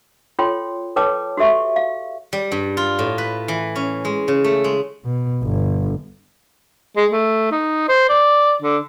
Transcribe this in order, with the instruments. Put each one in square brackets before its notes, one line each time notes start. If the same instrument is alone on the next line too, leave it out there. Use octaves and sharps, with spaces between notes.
[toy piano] F4 A4 C#5 G5 C6
A4 B4 C#5 G5 A5 D6
F#4 G4 A4 E5 C#6
F5
[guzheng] G3
G2
F4
A2
B4
E3
C#4
G#3
C#3
A3
G#3
[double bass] B2
G1
[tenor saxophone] G#3
A3
D#4
C5
D5
D3